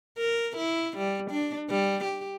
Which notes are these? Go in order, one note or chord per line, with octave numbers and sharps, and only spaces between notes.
A#4
E4
G3
D4
G3
G4